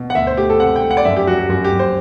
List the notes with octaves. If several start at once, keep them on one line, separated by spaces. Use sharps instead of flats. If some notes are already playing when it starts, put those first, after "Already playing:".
Already playing: B2
F#5
D2 E5
C5
A3 G4
A4
C3 F#5
G5
A3
F#5
D5
F#2 E5
G4
F#3 F#4
G4
F#2 F#4
G4
F#2
C5